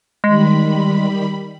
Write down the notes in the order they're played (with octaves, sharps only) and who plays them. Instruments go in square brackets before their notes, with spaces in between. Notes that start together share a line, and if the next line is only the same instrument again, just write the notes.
[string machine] D#3 G3 B5 [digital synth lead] G#3